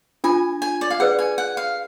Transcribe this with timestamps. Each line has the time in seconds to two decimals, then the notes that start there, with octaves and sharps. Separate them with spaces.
0.24 D4 F4 A4 G#5
0.62 G#5
0.81 D5
0.90 F5
1.00 G#4 B4 D5 F#5
1.19 G#5
1.38 F#5
1.57 F5